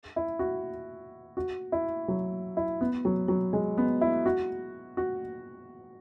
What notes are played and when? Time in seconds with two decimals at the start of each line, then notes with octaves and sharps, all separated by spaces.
0.16 E4
0.39 F#4
1.37 F#4
1.72 E4
2.08 F#3
2.57 E4
2.81 B3
3.05 F#3
3.28 F#3
3.53 G#3
3.78 B3
4.01 E4
4.26 F#4
4.97 F#4